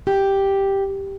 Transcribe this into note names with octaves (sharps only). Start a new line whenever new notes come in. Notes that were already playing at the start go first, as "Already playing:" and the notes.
G4